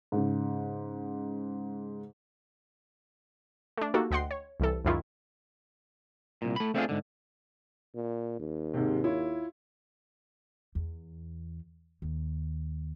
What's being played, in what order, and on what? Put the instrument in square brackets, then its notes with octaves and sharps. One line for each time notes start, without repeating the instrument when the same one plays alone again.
[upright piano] G#2 C#3
[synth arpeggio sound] A3 D4
A#3 D#4 F#4 G4 A4
D2 D#5 F#5 G5 C6 C7
C#5
C2 E3 A4
C#2 F#2 D#3 E4 F4 C#6
[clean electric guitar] C2 A#2
A3 B5
A3 C4 D4 D#4 F4 G#4
G#2 D3
[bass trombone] A#2
D#2
[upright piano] G#2 C3
E4 F4 C#5
[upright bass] E2
D#2